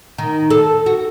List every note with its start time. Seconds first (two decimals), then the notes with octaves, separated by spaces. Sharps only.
0.18 D#3
0.50 A4
0.86 F#4